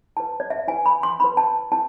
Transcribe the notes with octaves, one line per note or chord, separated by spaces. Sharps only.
E4 B4 A5
D5
E5
E4 B4 G#5
B5
C6
E4 B4 B5
A5
E4 A5